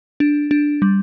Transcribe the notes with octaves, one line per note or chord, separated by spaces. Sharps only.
D4
D4
G3